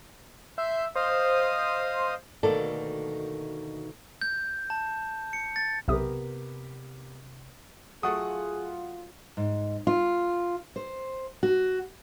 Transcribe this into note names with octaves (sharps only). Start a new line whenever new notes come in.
E5 C6 G6
C5 D#5 F5 D#6
D2 B2 D#3 A#3 A4 D5
G6
A5
C#7
A6
B1 C3 B3 G4 A#4 E5 D#6
F#3 A3 F4 G#4 A4 F#5 D#6
G#2
F4
C5
F#4